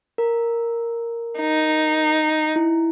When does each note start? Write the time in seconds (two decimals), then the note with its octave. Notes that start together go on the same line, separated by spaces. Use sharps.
0.18 A#4
1.39 D#4
2.56 E4